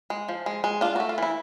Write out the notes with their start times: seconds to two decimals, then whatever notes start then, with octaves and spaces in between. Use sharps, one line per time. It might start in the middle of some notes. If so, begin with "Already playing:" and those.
0.10 G#3
0.28 F3
0.46 G#3
0.64 G#3
0.81 D4 F4
0.96 A3 F#4
1.09 F4
1.18 E3 E4